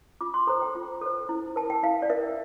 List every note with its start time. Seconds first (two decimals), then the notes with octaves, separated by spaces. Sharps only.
0.21 F4 D6
0.34 C6
0.47 A4 C5 A#5
0.62 G5
0.75 F4
1.01 A4 C5
1.29 E4
1.56 A#4 A5
1.70 G5
1.83 E4 F5
2.02 D5
2.10 A#4 E5